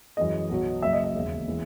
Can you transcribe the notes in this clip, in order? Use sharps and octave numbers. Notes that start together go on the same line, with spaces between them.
F#2 E3 G#3 D#5
B1 B2 F#3
F#1 F#2 C#3 E5
D#5
E5
E1 D#2 C#3
C#3 E3 G#3 B3